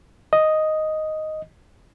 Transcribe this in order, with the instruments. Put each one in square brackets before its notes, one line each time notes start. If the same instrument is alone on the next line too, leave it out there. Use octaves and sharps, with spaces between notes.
[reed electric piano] D#5